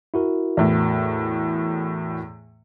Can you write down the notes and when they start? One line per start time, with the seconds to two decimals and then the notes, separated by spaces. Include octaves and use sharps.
0.14 E4 F#4 A#4
0.57 E2 A2